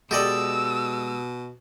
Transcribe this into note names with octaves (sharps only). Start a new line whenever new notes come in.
B2 G#3 G4 A4 D5 D#5 E6